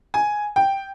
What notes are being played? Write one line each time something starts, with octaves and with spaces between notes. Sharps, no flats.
G#5
G5